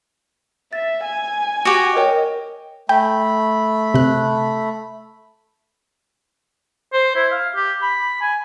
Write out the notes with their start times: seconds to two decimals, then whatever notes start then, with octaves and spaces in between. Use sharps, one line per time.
0.73 E5 A6
1.04 G#5
1.65 F#4 G4
1.96 A#4 C#5 D#5 G5
2.89 A3 G5 B5
3.94 C3 F#6
6.93 C5
7.16 E4
7.32 F5
7.55 G4
7.82 B5
8.21 G#5